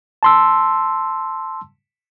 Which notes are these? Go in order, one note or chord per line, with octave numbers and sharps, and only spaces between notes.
A5 C6 E6